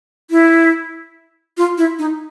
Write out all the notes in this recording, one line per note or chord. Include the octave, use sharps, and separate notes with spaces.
E4
F4
E4
D#4